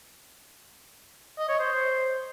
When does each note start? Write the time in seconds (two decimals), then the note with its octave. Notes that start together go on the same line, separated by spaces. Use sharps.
1.38 D#5
1.49 C#5
1.59 C5